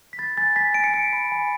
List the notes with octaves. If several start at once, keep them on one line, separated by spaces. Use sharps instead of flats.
B6
B5 A6
G#5 A6
G#5 B6
G#5 D7
C#7
G#5 D7
B5
G#5